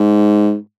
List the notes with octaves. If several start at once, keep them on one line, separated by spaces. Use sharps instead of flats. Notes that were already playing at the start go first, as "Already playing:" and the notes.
Already playing: G#2